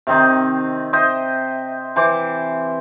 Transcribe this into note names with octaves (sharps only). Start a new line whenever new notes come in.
C3 D#3 C4 D#4
C5 D#5 E5 G5
E3 C5 D6